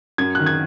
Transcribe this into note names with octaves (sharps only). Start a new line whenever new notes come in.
F#2 G#6
D#3 F#6
G#6